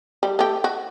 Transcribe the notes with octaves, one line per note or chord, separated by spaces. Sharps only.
G3
A3 G4
F#4